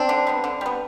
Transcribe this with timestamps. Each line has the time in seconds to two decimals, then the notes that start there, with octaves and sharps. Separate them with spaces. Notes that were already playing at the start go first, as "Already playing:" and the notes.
Already playing: C4 D4
0.09 D3
0.27 G3 B3
0.44 D3
0.61 G3 B3